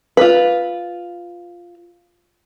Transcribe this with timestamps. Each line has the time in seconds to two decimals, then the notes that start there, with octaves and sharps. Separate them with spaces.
0.17 F4 B4